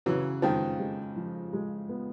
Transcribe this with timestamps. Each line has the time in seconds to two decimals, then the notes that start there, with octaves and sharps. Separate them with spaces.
0.06 C#3 E3 F#3
0.42 D#3 F3 G#3
0.79 G#3
1.16 F3
1.53 G#3
1.89 B3